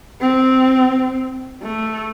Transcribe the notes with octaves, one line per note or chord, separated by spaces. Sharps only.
C4
A3